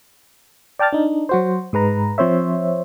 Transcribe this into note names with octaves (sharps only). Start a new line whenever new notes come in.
D5 G5 A5 F6 A6
D4 D#4
F#3 F#4 C5
G#2 G#3 B4 A#5
F3 C4 C5 C#5 E5